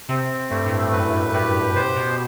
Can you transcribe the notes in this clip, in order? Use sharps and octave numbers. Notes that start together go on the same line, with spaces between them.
C3 C4
G2 A3
A2
G2
F#2 B4
G2
A2 G4
B2 C5
B2